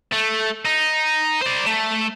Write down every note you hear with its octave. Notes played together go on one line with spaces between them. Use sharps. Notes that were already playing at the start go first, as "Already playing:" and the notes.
A3
D#4
C5 D5
A3